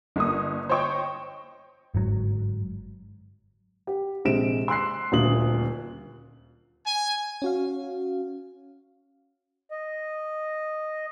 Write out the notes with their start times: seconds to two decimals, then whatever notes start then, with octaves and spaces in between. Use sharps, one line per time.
0.16 G1 A#3 D#6
0.69 C5 C#5 D#5 G5 C#6
1.94 G1 G#2 F#3
3.87 G4
4.25 A#1 C3 G#3 D7 E7
4.68 C6 E6 F#6 C7
5.12 D#1 D2 A#2 D#6 F#7
6.86 G#5
7.42 C#4 F#4 F5
9.71 D#5